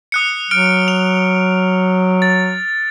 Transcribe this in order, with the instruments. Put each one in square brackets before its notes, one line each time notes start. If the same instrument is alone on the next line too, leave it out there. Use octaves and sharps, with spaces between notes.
[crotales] D#6 F#6 C#7
[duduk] F#3 [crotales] F6 D7 G7
[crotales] F7
A6